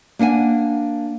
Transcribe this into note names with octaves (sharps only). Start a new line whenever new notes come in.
A#3 D4 F#5 G#5